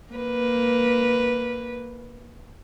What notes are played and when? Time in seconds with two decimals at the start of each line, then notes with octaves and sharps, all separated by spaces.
0.12 A#3 B4